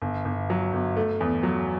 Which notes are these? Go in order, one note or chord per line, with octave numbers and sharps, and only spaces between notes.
G1
G1
F#3
G1
A3
E2
F#3